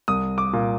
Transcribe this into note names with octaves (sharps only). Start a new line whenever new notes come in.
C2 D#6
D6
A#2